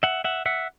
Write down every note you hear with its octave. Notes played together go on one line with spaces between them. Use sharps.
E5 F#5
E5 F#5
E5 F#5